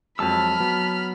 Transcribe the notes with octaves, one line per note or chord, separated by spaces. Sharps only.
F2 F#3 G#3 A5 B5 E6 F6
F#3 B3